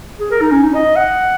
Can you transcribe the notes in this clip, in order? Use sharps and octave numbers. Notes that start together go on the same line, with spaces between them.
G#4
A#4
D#4
C#4
D#4
D#5
F#5